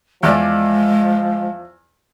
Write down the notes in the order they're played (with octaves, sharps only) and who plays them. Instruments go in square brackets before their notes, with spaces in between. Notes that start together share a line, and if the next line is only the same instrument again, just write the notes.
[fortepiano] E2 D5 [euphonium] F3 [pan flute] G#3